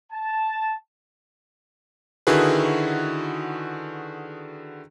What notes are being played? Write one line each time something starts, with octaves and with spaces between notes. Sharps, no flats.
A5
D3 D#3 E4 F#4 G#4 B4